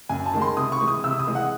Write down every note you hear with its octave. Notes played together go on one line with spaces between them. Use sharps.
F#2 G#5
A5
D#3 G#3
C6
C3 D#6
C#6
E3 G#3
D#6
C3 E6
D#6
E3 G#3
F#5